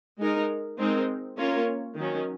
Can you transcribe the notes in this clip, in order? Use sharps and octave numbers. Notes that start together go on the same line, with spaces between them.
G#3 D#4 A#4
G#3 C4 D#4 A#4
A#3 C#4 F4 A#4 C#5
D#3 F#3 C#4